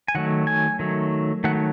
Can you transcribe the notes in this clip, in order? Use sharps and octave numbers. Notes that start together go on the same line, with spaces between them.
G#5
D#3 F#3 A3 F#5
G#5
D#3 F#3 A3
D#3 F#3 A3 F#5